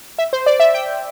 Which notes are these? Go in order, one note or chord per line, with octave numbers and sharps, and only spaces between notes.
E5
C5
D5
E5
G5